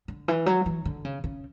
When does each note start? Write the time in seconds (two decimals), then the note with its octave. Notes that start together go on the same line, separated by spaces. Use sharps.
0.08 D3
0.28 E3
0.46 F#3
0.66 E3
0.85 D3
1.05 C#3
1.24 C#3